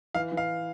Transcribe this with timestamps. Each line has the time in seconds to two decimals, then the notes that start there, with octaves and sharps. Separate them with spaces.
0.14 E3 F5
0.32 E3
0.37 F5